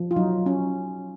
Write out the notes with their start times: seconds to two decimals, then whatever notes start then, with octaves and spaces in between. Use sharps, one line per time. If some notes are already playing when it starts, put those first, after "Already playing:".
Already playing: F3
0.11 F4
0.16 F#3 D#4
0.46 C#4